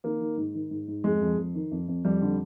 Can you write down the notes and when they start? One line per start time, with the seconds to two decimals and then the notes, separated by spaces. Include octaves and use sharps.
0.04 D#3 A#3
0.21 D#3
0.37 G#2
0.54 D#3
0.70 G#2
0.88 G#2
1.04 F2 G#3
1.21 F2
1.38 F2
1.55 D#3
1.71 F2
1.88 F2
2.05 F2 G3
2.22 D3